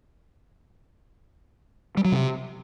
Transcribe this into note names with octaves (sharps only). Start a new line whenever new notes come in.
G3
F#3
C3